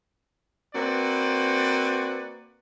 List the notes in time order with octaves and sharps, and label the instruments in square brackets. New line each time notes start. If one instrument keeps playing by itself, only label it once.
[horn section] A#3 C4 F#4 B4 D5